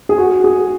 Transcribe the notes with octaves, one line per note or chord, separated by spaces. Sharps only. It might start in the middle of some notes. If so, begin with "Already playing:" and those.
G#4
F#4
G#4